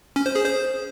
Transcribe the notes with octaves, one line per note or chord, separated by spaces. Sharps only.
C#4
C5
G#4
C5